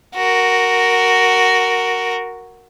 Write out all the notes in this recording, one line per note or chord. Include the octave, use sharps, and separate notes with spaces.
F#4 A#4